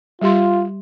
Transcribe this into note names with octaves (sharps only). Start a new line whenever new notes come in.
G3 F4 G4 C6